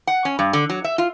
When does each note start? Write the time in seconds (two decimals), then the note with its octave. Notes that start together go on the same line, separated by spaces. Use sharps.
0.07 F#5
0.25 C#4
0.39 G2
0.53 D3
0.70 F#3
0.84 E5
0.98 F4